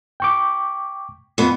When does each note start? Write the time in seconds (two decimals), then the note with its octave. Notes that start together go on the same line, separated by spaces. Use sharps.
0.20 G5 C#6 D6
1.38 F2 B3